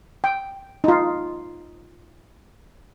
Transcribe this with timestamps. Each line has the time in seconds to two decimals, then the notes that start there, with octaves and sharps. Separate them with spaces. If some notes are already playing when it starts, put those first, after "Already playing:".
0.24 G5
0.84 D#4 F4